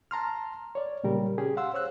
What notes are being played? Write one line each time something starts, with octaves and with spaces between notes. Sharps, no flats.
A5 A#5 C6 F6
C#5 D5
A#2 C#3 G3 A#4
C#4 G4 G#4
F5 F#5 C6 E6
C5 C#5 E6 F#6